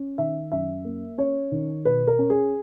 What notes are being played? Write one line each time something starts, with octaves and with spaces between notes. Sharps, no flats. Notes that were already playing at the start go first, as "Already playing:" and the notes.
Already playing: C#4
D#3 E5
F#2 E5
A#3
C#4 C#5
D#3
B2 B4
A#4
C#4
G#4